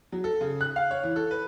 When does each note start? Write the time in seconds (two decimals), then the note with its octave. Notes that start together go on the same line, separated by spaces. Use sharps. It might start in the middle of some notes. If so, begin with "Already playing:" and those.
0.12 F#3
0.24 A4
0.41 C#3
0.61 F#6
0.76 F5
0.91 C#5
1.03 E3
1.16 A4
1.31 B4